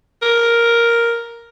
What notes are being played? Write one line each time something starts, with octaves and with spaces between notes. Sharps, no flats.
A#4